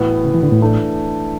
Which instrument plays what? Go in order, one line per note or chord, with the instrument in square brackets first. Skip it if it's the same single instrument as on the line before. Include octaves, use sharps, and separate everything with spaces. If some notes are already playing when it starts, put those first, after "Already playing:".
Already playing: [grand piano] A2 E3 B3 F#4
[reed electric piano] C#3
E3
D3
A2
[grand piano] E3 A3 D4